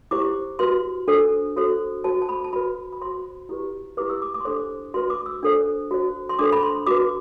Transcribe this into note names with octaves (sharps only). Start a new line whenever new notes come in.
E4 G4 C5 D6
F#4 B4 C6
D4 A4 C5
F#4 A4 C5
F#4 C5 A5
A5
B5
A5
F#4 B4 B5
B5
F#4 C5 C6
E4 G4 B4
E4 G4 B4 D6
E6
D6
D6
C6
D4 A4 C5 D6
F#4 B4 C6
D6
E6
D4 A4 C5
F#4 C5
C6
D4 A4 C5 D6
B5
C6
F#4 B4 D6